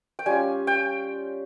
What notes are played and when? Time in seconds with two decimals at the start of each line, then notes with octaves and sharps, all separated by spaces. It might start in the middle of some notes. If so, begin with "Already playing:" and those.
0.19 G5
0.26 G3 C#4 F4 G#5
0.67 G5